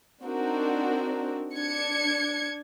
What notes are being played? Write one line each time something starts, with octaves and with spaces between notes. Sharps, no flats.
C4 D4 D#4 F#4 A#4
D4 G#6 C#7